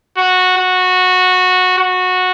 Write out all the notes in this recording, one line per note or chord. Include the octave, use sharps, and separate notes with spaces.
F#4
F#4
F#4